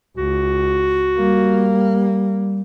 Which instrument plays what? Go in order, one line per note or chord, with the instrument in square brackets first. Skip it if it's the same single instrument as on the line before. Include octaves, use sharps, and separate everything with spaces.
[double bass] C#2 [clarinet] F#4
[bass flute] G3 [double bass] A#3